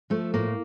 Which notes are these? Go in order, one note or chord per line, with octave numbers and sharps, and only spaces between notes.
F3 A3
A2 A#3